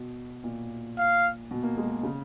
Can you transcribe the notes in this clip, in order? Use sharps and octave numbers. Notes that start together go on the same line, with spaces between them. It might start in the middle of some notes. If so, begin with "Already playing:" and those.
Already playing: B2
A#2
F5
B2
A#3
G#3
C#3